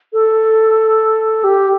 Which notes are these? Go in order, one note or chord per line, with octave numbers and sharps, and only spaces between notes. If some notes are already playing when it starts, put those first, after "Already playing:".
A4
G4